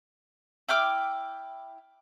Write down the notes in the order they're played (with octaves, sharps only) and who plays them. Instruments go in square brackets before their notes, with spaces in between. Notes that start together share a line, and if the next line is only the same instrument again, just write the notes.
[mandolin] E4 G5 D6 F6